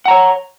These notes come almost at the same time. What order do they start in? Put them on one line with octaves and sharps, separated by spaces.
F#5 A#5 C#5